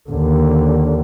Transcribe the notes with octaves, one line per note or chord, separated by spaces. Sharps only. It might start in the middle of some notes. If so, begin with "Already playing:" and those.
D#2 D3